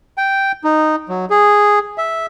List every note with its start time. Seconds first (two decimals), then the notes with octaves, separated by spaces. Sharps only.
0.18 G5
0.64 D#4
1.09 F#3
1.30 G#4
1.98 E5